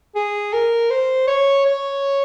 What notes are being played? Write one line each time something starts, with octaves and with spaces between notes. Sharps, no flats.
G#4
A#4
C5
C#5
C#5